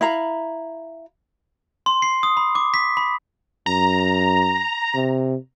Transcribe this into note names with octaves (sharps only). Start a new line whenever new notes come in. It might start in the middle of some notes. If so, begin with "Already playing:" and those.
E4 F5 A#5 B5
C6
C7
D#6
B5
D6
B6
B5
F#2 A#5
C3